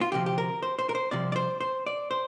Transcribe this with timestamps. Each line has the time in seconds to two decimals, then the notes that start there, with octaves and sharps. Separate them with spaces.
0.01 F4
0.12 D2 C3 F3 G4
0.26 G4
0.38 A#4
0.63 C5
0.79 C5
0.89 A#4
0.95 C5
1.11 C2 C3 F3 D5
1.32 D5
1.36 C5
1.61 C5
1.86 D5
2.11 C5